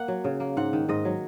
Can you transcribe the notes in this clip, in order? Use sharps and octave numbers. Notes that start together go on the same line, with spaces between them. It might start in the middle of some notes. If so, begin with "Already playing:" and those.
Already playing: A#3 F#5
F#3
C#3
A#3
G#2 F#5
D#3
G#2 D#5
F#3